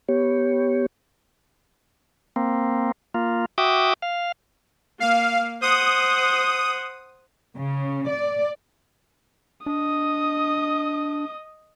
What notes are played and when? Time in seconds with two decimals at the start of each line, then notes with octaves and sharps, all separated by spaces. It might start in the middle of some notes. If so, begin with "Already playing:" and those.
0.09 B3 G4 C#5
2.36 A#3 C4
3.14 A#3 F4
3.58 F#4 E5 G5 D6 D#6
4.02 F5
5.00 A#3 F5
5.62 C5 F#5 D#6
7.57 C#3
8.09 D5
9.66 D4 D#5 D#6